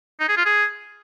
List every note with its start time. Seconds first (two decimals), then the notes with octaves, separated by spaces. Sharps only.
0.20 D#4
0.28 G#4
0.37 F4
0.45 G#4